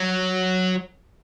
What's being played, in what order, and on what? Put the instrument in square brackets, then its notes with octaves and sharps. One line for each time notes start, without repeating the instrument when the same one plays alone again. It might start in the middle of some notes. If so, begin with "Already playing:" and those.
Already playing: [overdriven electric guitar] F#3